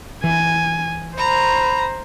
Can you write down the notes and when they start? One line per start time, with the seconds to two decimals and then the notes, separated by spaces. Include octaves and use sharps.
0.24 E3 G#5
1.18 C5 A#5 B5